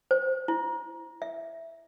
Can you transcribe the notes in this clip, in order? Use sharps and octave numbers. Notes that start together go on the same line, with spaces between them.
C5
E4
E5